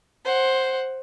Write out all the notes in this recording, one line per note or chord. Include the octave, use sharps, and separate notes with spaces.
C5 F#5